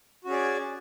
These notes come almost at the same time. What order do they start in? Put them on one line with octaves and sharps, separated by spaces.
F#4 C#4 G#4 D5